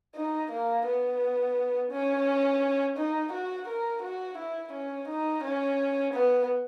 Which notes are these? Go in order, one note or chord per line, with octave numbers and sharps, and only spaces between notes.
D#4
A#3
B3
C#4
D#4
F#4
A#4
F#4
E4
C#4
D#4
C#4
B3